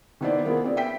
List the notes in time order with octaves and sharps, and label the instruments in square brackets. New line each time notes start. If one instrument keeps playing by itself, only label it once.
[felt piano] D#3 A#3 B3 E4 C5 D5
A#3 B3 F4 G#4
C4 D5
E5 G5 B6